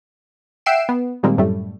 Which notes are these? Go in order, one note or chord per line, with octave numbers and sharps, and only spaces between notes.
E5 F#5 G5 C7 D7 E7
B3
A#2 D#3 G3 G#3 A#3 C4
F#2 A2 G3 A3